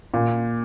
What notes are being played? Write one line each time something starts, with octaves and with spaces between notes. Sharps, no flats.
A#2